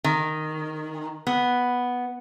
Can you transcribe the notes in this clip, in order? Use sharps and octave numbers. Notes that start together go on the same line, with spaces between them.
D#3
B3